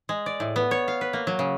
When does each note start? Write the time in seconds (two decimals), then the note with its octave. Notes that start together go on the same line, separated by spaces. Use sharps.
0.09 G#3
0.26 D5
0.40 A2
0.56 B3
0.71 C#5
0.88 F5
1.01 B4
1.13 A#3
1.27 F#3
1.39 C#3